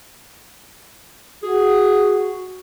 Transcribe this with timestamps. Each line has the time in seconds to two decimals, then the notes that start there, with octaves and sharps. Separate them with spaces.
1.43 F#4 G#4